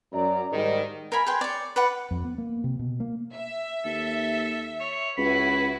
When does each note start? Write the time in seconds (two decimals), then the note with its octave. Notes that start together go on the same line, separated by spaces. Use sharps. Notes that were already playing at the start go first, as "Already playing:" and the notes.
0.13 F#2 D5 A#5
0.52 G#2 D#3 G3
1.12 A#4 F5 G#5 B5
1.26 G#4 B4 G5 C6
1.41 C#5 D5
1.76 B4 D5 F#5
2.11 F2
2.25 B3
2.38 A#3
2.64 C3
2.79 B2
3.00 A#3
3.33 E5
3.85 D#2 A4
4.81 C#5
5.17 C#2 E4 F#4 B4 B5